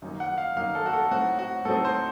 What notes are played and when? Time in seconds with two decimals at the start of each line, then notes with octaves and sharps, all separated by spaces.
0.02 F#2 D#3 A#3 D#4
0.20 F#5
0.38 F5
0.56 F#2 D#3 A#3 D#4 F5
0.75 A4
0.86 F#4
0.93 A4
1.11 A2 F#3 C4 D#4 F#4
1.39 F#4
1.65 A2 F#3 C4 D#4 A4
1.85 C5